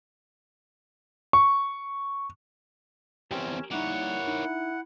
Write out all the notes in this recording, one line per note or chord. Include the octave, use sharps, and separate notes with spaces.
C#6
E2 C4 C#4 G4 A#4 G5
G3 A#3 D#4 E4 C#5 F#5
D#4